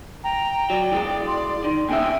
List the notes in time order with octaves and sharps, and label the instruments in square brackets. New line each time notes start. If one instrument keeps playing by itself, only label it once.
[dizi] G5 [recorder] A#5
[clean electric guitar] F#3 [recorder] D5
[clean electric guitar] E3 G#3
[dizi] C6
[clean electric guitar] D#3
[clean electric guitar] D#2 C#3 E5 [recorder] G5 [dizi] G#5